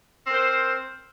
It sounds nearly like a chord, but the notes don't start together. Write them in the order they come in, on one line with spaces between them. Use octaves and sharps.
C4 A#4 C5